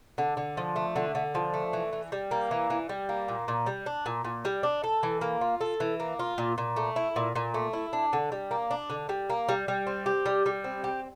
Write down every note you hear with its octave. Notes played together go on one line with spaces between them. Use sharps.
D3
D3
F3
A3
D3
D3
F3
A3
E3
E3
G3
A#3
E3
E3
G3
A#3
A#2
A#2
G3
D4
A#2
A#2
G3
D4
A4
E3
A#3
F4
A4
E3
A#3
F4
A#2
A#2
A3
E4
A#2
A#2
A3
E4
D4
D3
G3
A#3
D4
D3
G3
A#3
G3
G3
C4
G4
G3
G3
C4
G4